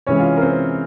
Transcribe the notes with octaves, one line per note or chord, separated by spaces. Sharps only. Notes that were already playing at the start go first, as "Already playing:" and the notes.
C3 E3 G#3 C#4 C#5
F4
A#4
C4 C5